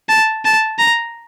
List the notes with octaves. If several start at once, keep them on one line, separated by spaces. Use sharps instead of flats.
A5
A5
A#5